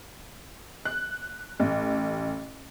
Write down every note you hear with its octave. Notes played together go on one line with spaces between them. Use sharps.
F#6
A1